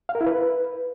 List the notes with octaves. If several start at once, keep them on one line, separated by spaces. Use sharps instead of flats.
F5
A#4
E4
B4